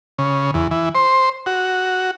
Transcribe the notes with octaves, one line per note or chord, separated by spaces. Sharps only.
C#3
E2
E3
C5
F#4